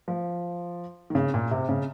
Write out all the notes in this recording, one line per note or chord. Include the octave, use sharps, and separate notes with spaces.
F3
D#3
C#3
A#2
C3
C#3